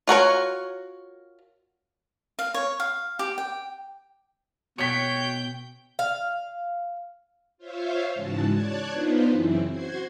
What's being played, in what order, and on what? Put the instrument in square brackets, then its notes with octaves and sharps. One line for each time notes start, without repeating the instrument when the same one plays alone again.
[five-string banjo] F4 F#4 A#4 C#5
[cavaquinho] F5
C#5
F5
G4
G5
[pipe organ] B2 [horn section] F#4 C#5 [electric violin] G5 G6 [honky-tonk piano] B6 C#7
[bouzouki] F5
[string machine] F4 C5 C#5 E5 F5
G#2 C#3 E3 G#3 F#4 A5
C#5 D5 A5 F#6 G#6
B3 D4 D#4 F4 B4 C5
F#2 C#3 E3 C4 E4
F#4 C5 C6 G#6